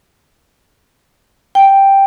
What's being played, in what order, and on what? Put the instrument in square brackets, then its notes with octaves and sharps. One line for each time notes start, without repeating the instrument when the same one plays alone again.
[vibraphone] G5